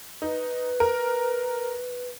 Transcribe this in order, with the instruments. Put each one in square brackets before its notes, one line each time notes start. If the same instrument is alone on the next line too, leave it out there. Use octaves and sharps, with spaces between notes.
[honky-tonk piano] D#4 [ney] B4
[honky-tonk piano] A#4